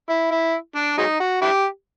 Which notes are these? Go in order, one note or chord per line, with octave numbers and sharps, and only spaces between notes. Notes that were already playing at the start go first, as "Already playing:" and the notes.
E4
E4
D4
F#3 G#3 D#4
F#4
D4 E4 G4